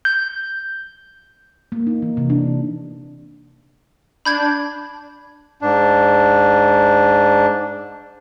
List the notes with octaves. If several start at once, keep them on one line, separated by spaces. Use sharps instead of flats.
G6
A#3
D#4
E3
C3
D4
D4 B5 G6 G#6
G#2 D4